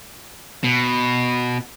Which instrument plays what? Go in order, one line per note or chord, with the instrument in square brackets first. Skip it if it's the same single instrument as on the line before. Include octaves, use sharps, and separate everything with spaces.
[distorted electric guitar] B2